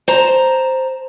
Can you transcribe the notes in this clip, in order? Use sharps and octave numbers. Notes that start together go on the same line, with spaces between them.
C5 A5 A#5